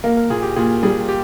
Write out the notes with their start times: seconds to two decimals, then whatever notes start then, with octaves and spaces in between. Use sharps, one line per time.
0.04 A#3 A#4
0.17 A#4
0.30 A#2 G#4
0.43 G4
0.56 A#2 G#4
0.83 G3 G#4
1.09 G4